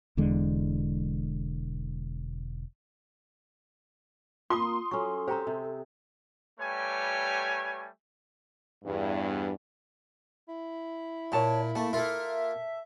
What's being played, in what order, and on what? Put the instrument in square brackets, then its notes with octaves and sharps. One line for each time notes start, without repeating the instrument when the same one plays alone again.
[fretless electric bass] E1 E2 D3 G#3
[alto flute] A#3 [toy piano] F4 D6 [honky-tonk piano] C6 D#6
[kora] F#3 C#4 [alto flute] A4 [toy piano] C#6
[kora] C4 G4 [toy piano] C5 G5 A#5
[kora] C3
[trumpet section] G3 A3 G4 B4 C#5 G#5
[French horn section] E2 G2
[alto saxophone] E4
[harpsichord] A#2 [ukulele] C#5 A5 A#5
[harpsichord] A3 [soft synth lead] A#3 [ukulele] A5
[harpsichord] A#3 F4 [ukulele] A4 A#4 [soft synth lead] E5